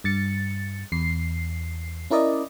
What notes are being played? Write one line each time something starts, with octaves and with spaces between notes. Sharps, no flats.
G2 A6 C#7
E2 C7
C#4 E4 A#4 D5 D#5